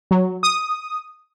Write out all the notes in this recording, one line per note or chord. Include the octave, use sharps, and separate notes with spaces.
F#3
D#6